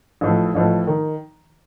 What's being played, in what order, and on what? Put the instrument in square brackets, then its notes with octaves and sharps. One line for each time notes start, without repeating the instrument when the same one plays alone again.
[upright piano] A1 A2 F3
A1 A2 F3
D#3